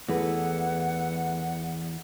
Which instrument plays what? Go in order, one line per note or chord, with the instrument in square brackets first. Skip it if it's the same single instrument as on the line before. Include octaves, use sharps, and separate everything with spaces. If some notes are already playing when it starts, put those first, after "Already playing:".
[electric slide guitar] E2 [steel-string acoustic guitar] A3 E4 B4 [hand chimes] G#4 [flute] F#5